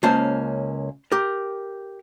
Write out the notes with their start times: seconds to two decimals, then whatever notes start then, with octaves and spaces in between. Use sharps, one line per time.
0.03 C#2 A#3 C#4 C5 A5
1.12 G4 A#4